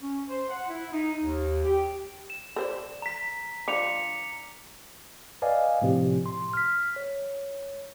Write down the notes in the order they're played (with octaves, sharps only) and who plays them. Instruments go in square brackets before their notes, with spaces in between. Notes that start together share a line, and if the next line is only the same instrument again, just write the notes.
[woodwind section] C#4
C5
F#5
E4
D#4
D#2
G4
[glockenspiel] E7
[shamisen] A4 C5 D5
[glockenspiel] A#5 B6
[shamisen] F3 D4 [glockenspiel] D6 C#7 F7
[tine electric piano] B4 D5 D#5 F5 G#5
A2 C3 F3 C4 G4
C6
F6 B6
C#5